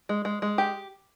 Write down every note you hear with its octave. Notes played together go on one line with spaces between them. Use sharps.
G#3
G#3
G#3
G4